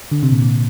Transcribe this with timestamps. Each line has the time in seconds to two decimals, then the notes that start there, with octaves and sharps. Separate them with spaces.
0.12 D3
0.23 C3
0.32 A#2
0.42 A#2